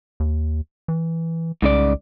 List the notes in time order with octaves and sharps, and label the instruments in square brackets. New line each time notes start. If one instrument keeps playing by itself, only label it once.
[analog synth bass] D#2
E3
[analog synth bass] C2 [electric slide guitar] G#2 C#3 D5